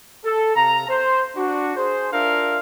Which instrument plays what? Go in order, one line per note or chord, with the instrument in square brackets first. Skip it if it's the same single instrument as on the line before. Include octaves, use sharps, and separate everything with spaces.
[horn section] A4
C3 F5 A#5
C5
D4 F#4
G#4 C5
D4 F4 A#4 E5 F5